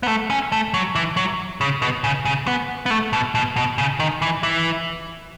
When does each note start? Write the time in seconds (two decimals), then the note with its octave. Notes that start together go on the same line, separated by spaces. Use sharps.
0.03 B3
0.08 A3
0.30 C#4
0.52 A3
0.74 F#3
0.95 E3
1.17 F#3
1.61 C#3
1.82 B2
2.04 C#3
2.25 C#3
2.47 B3
2.86 B3
2.90 A3
3.13 B2
3.35 B2
3.56 B2
3.78 C#3
4.00 D#3
4.22 E3
4.43 E3